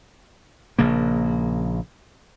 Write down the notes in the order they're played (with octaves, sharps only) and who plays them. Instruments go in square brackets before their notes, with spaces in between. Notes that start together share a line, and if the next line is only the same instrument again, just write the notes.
[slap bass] A#1 C#3 A#3